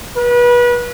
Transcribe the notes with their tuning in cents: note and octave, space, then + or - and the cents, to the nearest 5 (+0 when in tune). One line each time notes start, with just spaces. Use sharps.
B4 -30